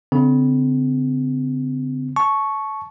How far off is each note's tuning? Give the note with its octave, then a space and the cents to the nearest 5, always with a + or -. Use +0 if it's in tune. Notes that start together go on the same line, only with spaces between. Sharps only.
D3 -40 C4 -35
A5 -20 C#6 +0